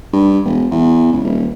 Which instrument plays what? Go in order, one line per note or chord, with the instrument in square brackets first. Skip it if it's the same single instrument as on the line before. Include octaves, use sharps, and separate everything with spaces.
[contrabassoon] G2
E1
E2
C#2
D#1